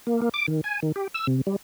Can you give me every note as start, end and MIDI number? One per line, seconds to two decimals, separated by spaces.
0.07 0.21 58
0.22 0.29 58
0.34 0.46 86
0.48 0.61 51
0.64 0.80 80
0.82 0.92 51
0.96 1.07 67
1.14 1.27 88
1.27 1.41 48
1.47 1.56 55